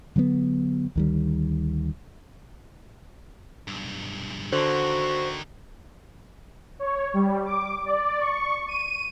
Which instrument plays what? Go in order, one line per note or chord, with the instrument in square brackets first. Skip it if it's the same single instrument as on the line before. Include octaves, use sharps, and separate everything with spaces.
[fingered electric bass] D3 F#3 G#3 B3
D2 D#3 G3
[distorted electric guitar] B1 G2
[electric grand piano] D3 [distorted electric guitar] D#3 A#3 [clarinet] F#4 [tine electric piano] C5
[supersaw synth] C#5
G3
D6
D5
C#6
D#7